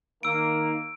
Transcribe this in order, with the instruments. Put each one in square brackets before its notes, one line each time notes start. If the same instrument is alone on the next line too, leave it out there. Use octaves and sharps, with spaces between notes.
[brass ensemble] D#3 A#3 [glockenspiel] E6 D7